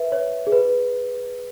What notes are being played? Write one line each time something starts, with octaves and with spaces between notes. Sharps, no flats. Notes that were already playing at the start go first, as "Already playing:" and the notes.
Already playing: B4 E5
C#5
G#4
B4